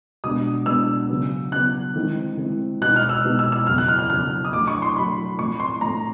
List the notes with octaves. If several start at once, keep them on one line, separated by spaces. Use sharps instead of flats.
B2 G#3 B3 D4 F#4 D#6
B2 G#3 B3 D4 F#4 E6
C#3 F#3 B3
C#3 F#3 B3 F#6
D#3 G#3 C4 E4
D#3 G#3 C4 E4
B2 G#3 B3 D#4 F#4 F#6
F6
E6
B2 G#3 B3 D#4 F#4
E6
E6
F2 C#3 F#3 B3 F6
F#6
F6
F6
F2 C#3 F#3 B3 F6
D#6
D3 F#3 A3 D6
C#6
C6
D3 F#3 A3 B5
A2 F3 A3 C4 C#6
C6
A2 F3 A3 C4 A#5